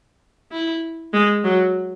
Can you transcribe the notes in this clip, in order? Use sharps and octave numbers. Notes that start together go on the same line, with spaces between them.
E4
G#3
F#3